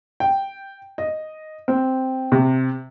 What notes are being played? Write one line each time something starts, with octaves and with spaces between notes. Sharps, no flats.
G5
D#5
C4
C3